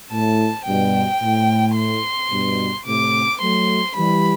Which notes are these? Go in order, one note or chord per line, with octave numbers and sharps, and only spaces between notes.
A2 A5
G2 B2 G5
A2
C6
G2 B2
A2 C3 D6
F#3 A3 C6
E3 G3 B5